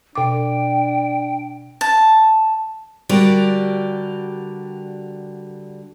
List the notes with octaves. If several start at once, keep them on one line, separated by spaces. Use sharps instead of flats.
B2 D4 G5 D6
A5
D3 G3 F#4 G4 A#4 D5